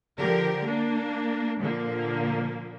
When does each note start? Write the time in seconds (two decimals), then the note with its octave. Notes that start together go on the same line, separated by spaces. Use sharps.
0.19 D3 F3 G4 A#4
0.65 A#3 D4
1.62 A#2 D3 F3 A#3